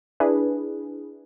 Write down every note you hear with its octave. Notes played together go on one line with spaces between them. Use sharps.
D4 E4 G#4 B4